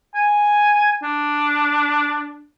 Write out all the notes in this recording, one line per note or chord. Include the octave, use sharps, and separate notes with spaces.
G#5
D4